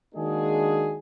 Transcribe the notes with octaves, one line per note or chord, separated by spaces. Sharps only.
D#3 G#3 A#3 D4 F#4 G#4